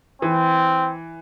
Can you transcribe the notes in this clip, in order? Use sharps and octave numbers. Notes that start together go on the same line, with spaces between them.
E3 C4